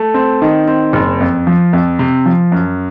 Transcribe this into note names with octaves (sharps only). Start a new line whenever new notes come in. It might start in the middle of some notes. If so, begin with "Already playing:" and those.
Already playing: A3
C4
D#3
C4
F#1
F2
F3
F2
C3
F3
F#2